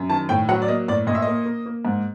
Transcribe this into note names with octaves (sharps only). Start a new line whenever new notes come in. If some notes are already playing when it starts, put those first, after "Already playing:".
Already playing: F#2
D#3 A5
A2 G5
F#3 F#5
D5
A#3 D#5
A2 D5
A#2 D#5
E5
A#3 D#5
A#3
A#3
G#2